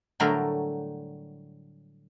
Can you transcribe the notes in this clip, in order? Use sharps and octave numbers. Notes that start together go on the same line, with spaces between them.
A2 D3 F#3 G3 A3 A#4